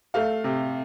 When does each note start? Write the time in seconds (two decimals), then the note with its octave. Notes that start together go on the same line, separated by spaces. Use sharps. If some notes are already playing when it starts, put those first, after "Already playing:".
0.14 A3 F5
0.44 C3